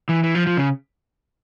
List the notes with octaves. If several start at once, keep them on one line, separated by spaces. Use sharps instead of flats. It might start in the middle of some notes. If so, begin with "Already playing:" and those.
E3
E3
F3
F3
C#3